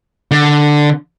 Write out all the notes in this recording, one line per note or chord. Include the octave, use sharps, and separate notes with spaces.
D3